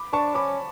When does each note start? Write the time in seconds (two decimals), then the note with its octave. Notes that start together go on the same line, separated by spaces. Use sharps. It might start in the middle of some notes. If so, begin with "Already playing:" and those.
Already playing: B5 D6
0.13 D4 A5 C#6
0.35 C#4 B5 D6